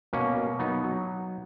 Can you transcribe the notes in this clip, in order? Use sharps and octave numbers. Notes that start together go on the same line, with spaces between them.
B2 A#3 C#4
B2
F#3 B3 D#4
F#3